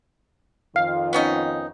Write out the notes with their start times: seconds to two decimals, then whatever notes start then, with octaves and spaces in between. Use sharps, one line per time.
0.76 F2 D#3 F4 F5
1.13 B3 C#4 D#4